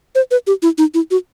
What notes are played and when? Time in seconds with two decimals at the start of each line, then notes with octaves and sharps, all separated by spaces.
0.15 C5
0.31 B4
0.47 G4
0.62 E4
0.78 D#4
0.94 E4
1.11 F#4